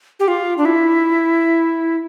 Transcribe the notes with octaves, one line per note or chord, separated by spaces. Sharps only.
G4
F4
D4
E4